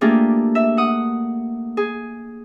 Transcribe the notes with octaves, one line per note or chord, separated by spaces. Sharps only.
A3 A#3 D4 F4 G4 G#4
E5
F#5 D#6
G#4